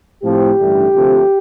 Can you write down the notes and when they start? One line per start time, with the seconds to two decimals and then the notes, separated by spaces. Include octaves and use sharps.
0.23 A2 F3 C4 G4
0.58 A1 G2 D3 A3 D4
0.93 D2 C3 F3 A3 C4